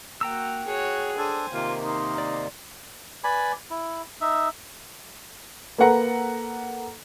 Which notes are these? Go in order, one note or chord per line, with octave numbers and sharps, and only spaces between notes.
A#3 F#4 G5 A#5 E6
F#4 G#4 C#5
D4 A4 C5 G#5
C3 D#3 A#3 F4
D#4 C6
D5
B4 D5 G#5 B5
E4
D#4 E5
A#3 A4 B4 F#5 A#5